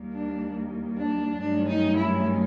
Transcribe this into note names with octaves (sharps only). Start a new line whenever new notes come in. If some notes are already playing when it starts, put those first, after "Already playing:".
Already playing: D#2 D#3 G3 A#3
D4
D4
G2 D#3 F#3 A3 C#4 D4
D#4
E4